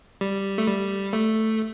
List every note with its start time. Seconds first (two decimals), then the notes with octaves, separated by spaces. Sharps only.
0.21 G3
0.58 A3
0.67 G3
1.13 A3